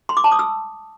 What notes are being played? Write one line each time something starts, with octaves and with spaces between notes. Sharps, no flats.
C6
D6
A5
D#6
E6